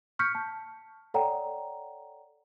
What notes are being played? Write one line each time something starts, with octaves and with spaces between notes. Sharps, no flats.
C#6 F6 G6 B6 C#7
A5
A4 C#5 D5 F#5 G5 A#5